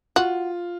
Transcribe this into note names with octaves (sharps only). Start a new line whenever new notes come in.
F4 F#4